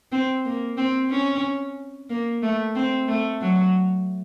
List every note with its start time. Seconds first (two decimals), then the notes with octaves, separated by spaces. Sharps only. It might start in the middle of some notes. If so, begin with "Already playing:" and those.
0.12 C4
0.45 A#3
0.77 C4
1.11 C#4
2.10 A#3
2.42 A3
2.75 C4
3.08 A3
3.41 F#3